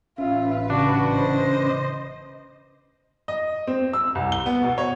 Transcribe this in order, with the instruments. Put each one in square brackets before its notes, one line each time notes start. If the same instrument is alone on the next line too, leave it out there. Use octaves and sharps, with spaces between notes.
[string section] A1 B4 [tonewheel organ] C#4 E5 [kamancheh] F4
[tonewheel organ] C#3 C#4 [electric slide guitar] D4 [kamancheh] F#4
[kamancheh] C5 D#5
[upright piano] D#5
C4
E6
C2
G7
B3
B2
C#5